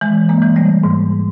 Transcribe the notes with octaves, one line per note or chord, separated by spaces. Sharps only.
E3 G#3
G#3 A#3
E3
G3 A3
G#2